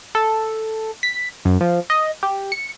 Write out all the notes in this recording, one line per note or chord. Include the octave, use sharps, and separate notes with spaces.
A4
B6
F#2
F3
D#5
G4
C#7